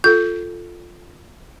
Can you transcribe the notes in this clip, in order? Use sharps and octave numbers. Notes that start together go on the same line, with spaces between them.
F4 A4 G6